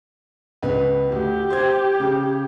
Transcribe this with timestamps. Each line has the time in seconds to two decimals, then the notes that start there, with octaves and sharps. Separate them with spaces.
0.63 C#2 B3 B4
1.12 D2 G4
1.50 C5 G#6
2.00 C#3